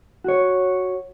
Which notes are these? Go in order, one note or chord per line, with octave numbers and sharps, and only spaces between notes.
F#4 C#5